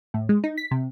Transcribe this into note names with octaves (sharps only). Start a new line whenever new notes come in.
A2
G#3
D#4
B6
C3